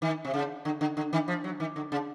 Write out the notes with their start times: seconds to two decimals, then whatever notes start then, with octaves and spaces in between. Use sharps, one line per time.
0.02 D#3
0.25 C3
0.34 C#3
0.65 D3
0.81 D3
0.97 D3
1.13 D#3
1.28 F3
1.44 F#3
1.60 D#3
1.76 D3
1.92 C#3